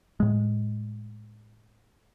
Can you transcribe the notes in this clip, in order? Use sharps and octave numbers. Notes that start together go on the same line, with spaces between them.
A2 G#3